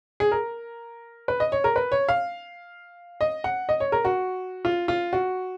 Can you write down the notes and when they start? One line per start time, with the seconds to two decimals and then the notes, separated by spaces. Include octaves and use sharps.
0.20 G#4
0.32 A#4
1.28 B4
1.40 D#5
1.52 C#5
1.64 A#4
1.76 B4
1.92 C#5
2.09 F5
3.21 D#5
3.44 F#5
3.69 D#5
3.80 C#5
3.92 A#4
4.05 F#4
4.65 F4
4.88 F4
5.13 F#4